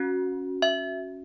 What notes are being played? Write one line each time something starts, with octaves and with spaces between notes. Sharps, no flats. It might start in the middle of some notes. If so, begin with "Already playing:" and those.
Already playing: C#4 F#4
E5